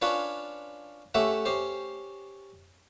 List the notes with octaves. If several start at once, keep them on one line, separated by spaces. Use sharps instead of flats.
C#4 D4 F4 B4 C#5
A3 C#4 G4 E5 F#5
C#4 G4 C5